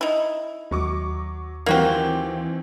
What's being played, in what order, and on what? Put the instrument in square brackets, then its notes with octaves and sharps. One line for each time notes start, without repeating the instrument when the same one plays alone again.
[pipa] D#4 E4
[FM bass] D#2 [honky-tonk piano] F#3 C#6 D6
[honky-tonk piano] D#3 E3 C4 [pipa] A#3 F#4 G4